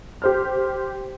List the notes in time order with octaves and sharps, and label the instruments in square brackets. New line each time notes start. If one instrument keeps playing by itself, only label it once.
[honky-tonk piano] G4 C5 F6